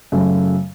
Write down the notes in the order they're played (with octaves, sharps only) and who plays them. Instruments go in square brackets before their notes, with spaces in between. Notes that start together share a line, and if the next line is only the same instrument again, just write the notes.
[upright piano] F#2 C#3 F#3 A3